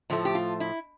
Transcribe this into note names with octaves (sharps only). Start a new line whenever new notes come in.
A2 F3 A3
G4
F4
E4